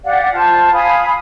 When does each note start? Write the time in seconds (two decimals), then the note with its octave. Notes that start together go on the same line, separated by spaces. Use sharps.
0.04 G4 D5 F5 F#5
0.34 F4 C5 A5
0.72 F5 G#5 B5 D#6